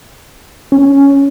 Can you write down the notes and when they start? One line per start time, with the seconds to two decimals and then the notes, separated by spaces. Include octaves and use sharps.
0.72 C#4